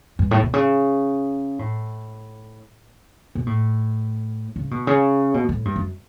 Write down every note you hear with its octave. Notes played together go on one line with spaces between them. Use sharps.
G2
A2
B2
C#3
A2
B2
A2
C#3
B2
C#3
B2
A2
G2
F#2